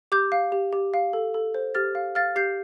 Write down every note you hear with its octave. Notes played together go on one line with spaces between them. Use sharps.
G4 D6 G6
F5
G4
G4
F5
A4
A4
C5
G4 F6 A6
F5
F5 F6 A6
G4 G6 C7